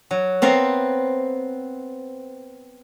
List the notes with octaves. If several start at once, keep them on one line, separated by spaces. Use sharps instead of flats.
F#3
B3 C4 A#4 F5